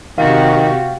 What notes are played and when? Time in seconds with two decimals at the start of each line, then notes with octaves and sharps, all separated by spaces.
0.18 C3 D#3 F#4 G4 F5 G5 A6